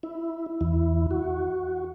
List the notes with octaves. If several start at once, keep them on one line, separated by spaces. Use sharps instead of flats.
E4
E2 E4
F#4